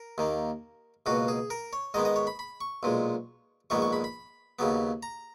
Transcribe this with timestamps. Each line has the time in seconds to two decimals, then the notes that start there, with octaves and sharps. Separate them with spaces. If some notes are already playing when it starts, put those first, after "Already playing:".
Already playing: A#4
0.18 D#2 D#3 A#3
1.06 C#2 B2 A#3 F#4
1.28 G#4
1.50 A#4
1.73 C#5
1.94 G#2 D#3 G#3 B3 D#5
2.05 D#5
2.16 C#5
2.27 B5
2.39 B5
2.61 C#6
2.83 B1 A#2 G#3
3.70 A#1 G#2 D#3 G#3 B3 C#6
3.82 C#6
3.93 B5
4.04 B5
4.59 D#2 C#3 F#3 B3
5.03 A#5